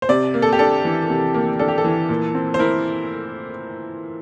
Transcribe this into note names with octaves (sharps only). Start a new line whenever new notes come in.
C5
C3 D5
A#3
A4
G4
D4 A4
E3
C3
A#3
D4 A4
G4
A4
E3
A#2
C4
C5
E4 A#4